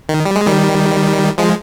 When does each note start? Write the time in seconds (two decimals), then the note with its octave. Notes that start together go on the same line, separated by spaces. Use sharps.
0.09 D#3
0.25 G3
0.36 G#3
0.47 D#3 G3
1.38 F3 G#3